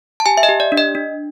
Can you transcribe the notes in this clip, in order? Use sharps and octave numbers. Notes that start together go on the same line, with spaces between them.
A5
G4 G#5
E5
D#5
G4
D5
D4
D#5
D4